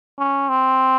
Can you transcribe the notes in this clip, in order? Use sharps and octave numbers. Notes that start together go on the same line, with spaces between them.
C#4
C4